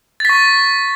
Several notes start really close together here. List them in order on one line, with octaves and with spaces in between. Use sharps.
A6 B6 C#6